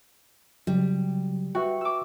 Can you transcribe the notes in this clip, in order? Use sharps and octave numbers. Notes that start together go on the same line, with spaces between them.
C#3 F#3 G3
F#4 B4 E5 G5
D6 E6